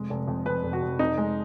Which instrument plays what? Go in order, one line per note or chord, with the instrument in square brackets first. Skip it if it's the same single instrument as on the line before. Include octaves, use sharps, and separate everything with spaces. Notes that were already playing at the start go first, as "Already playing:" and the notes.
Already playing: [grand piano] F1 G#3
F1
F2
F2 B4
F1
F#4
F1
F1 D#4
G#3